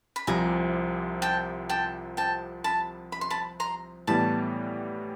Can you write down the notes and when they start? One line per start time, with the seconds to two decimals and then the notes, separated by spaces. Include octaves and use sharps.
0.16 B5
0.27 C2 C3 F3 G#5 A#5
1.22 G5 A5
1.69 G5 A5
2.17 G5 A5
2.64 A5 B5
3.12 B5
3.21 C6
3.30 A5 B5
3.60 A#5 C6
4.07 A2 E3 G3 B3 A5 B5